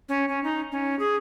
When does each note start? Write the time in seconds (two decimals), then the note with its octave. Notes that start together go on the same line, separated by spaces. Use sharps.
0.09 C#4
0.28 C#4
0.44 D#4
0.72 C#4
0.99 G#4